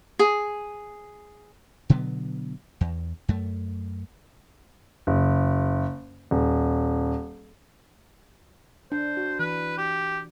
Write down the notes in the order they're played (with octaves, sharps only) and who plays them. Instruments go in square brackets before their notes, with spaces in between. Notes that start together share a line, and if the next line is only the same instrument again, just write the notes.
[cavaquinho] G#4
[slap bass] B2 D3 F#3 B3
E2
F#2 A3
[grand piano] F#1
D#1
[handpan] D4 [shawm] C5
[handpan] F#4
[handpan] E3 [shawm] B4
[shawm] G4